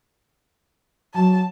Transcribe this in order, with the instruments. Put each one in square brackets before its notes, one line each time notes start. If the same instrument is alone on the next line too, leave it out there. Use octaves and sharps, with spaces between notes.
[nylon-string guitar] F#3 [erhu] A5